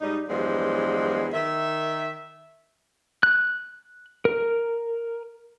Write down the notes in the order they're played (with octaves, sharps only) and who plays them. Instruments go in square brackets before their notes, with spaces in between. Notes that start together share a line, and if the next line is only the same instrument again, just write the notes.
[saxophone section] G#2 G3 D#4
E2 G2 F3 F#3 G#3
D#3 E5
[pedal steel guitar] F#6
A#4